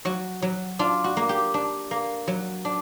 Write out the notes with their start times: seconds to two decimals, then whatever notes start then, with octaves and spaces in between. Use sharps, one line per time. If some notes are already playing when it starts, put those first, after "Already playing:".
0.05 F#3 F#4
0.42 F#3
0.79 D4 F4
1.04 F#4
1.17 A#3
1.29 G4
1.54 D4
1.91 A#3
2.27 F#3
2.65 D4